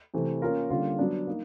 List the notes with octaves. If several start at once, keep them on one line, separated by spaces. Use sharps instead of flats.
C3 E3 A3 C4
A#3 C#4 F4 A#4
D3 G3 A#3 C#4 F4
F#3 B3 D4
A#3 D#4